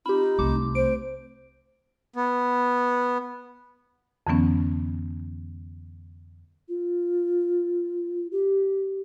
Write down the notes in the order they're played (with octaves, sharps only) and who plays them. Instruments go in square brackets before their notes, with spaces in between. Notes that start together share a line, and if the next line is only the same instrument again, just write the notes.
[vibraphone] C4 F4 [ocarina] D#4 [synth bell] G4 B5
[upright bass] C2 [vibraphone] A3 C4 [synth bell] D6
[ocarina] C5 [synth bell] D7
[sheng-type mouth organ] B3
[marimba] F2 D3 E3 F#3 B3 C#4
[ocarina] F4
G4